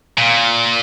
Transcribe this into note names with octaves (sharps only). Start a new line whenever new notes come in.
A#2